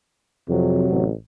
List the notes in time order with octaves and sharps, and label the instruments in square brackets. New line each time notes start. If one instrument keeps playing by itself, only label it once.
[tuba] F2 [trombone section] C3 F#3
[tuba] A1